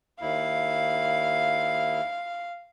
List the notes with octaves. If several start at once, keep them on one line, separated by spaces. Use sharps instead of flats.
D#2 E4 F5